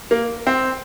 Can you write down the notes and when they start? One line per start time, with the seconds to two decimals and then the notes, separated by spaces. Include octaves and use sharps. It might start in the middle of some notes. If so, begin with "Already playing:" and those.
0.11 A#3
0.47 C4